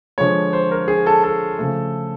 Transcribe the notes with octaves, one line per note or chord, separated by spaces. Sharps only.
D3 F3 G#3 C#5
C5
A#4
G#4
A4
A4
C#3 F3 A3